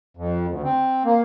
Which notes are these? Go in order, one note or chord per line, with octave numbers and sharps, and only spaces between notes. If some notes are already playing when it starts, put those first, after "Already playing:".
F2
D2
C4
A#3